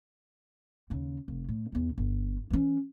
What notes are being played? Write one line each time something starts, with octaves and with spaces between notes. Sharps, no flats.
D#2 C#3
F1
A2
E2 D#4
G1
E3 C#4